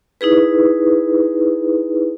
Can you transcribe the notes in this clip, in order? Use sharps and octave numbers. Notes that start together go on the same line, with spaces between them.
D#4 E4 G#4 B4